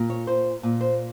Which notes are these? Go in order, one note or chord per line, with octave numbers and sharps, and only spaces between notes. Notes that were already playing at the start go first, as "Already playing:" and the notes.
Already playing: A#2
C#5
C5
A#2
C5